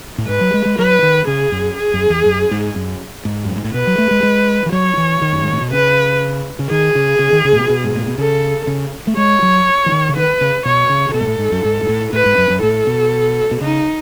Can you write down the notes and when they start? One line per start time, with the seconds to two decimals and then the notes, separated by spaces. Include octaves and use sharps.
0.18 A2
0.28 G#2 B4
0.41 F#3
0.54 G#3
0.65 G#3
0.78 F#3 B4
1.03 D#3
1.27 C#3 G#4
1.52 F#2
1.76 G#4
1.94 F#2
2.10 E2
2.26 F#2
2.51 G#2
2.76 F#2
3.25 G#2
3.45 F#2
3.56 G#2
3.64 A2
3.74 B2 B4
3.87 F#3
3.98 A3
4.11 G#3
4.23 G#3
4.66 E3
4.72 F#3 C#5
4.97 E3
5.22 D#3
5.32 F#2
5.43 G#2
5.53 A2
5.61 B2
5.71 C#3 B4
6.59 C#3
6.70 D#3 G#4
6.95 C#3
7.19 C#3
7.32 D#3
7.45 C#3
7.52 A2
7.56 B2
7.69 B2
7.84 G#2
7.95 A2
8.06 B2
8.18 C#3 A4
8.67 C#3
9.07 A3
9.17 G#3 C#5
9.42 F#3
9.86 E3
9.92 D#3
10.09 C#3
10.15 D#3 B4
10.41 C#3
10.65 B2 C#5
10.90 C#3
11.09 C#3
11.14 B2 A4
11.21 G#2
11.28 A2
11.39 G#2
11.52 F#2
11.65 G#2
11.83 G#2
11.89 A2
12.13 A2 B4
12.26 G#2
12.37 F#2
12.50 F#2
12.62 A2 A4
12.87 B2
13.51 B2
13.61 C#3 D#4